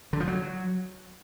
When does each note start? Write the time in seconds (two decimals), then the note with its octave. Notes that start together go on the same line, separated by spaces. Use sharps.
0.13 D3
0.20 F3
0.28 F#3